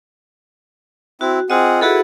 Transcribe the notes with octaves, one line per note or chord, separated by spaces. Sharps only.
C4 E4 F#4
C4 F4 G#4 D#5 F#5
E4 F#4 G#4 A4 B4 F#5